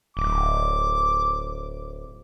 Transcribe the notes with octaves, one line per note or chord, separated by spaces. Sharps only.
D1 D6